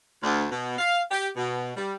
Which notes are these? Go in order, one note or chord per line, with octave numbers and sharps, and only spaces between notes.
D2
B2
F5
G4
B2
G3